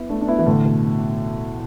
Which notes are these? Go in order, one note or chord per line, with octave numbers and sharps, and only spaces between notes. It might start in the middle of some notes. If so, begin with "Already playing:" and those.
Already playing: B3 E4
A3 D4
D4
B3 E4
E3
A2 D3
B2